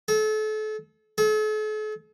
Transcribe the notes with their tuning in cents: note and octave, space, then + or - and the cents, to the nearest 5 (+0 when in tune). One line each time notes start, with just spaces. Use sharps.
A4 -35
A4 -45